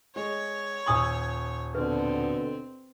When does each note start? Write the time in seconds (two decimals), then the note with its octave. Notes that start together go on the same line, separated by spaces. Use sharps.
0.16 G#3 C#5
0.86 D#1 G#5 C#6 D#6 E6 F#7
1.75 B2 D3 C4 B4